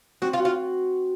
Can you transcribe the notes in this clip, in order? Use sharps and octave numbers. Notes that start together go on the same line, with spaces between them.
C4 F#4
F4
F#4
F4